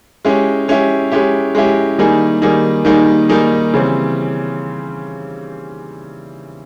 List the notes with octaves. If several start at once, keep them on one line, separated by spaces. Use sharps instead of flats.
G#3 C#4 E4 G4
G#3 C#4 E4 G4
G#3 C#4 E4 G4
G#3 C#4 E4 G4
D#3 G3 A#3 D#4 G#4
D#3 G3 A#3 D#4 G#4
D#3 G3 A#3 D#4 G#4
D#3 G3 A#3 D#4 G#4
C#3 E3 G3 C4